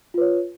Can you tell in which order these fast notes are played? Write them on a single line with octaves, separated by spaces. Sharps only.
F4 B4 C#5